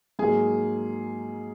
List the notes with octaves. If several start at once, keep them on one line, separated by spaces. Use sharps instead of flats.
G#2 F#3 A#3 G#4